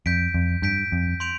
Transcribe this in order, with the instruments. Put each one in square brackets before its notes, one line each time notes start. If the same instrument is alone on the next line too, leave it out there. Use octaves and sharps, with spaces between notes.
[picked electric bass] F2 [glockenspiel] G6 B6 D7
[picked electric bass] F2
[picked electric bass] G2 [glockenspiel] G6 B6 D7
[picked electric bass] F2
[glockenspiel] C6 G6 D7 F7